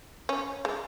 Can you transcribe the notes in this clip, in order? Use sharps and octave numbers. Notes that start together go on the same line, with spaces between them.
C#4
G#3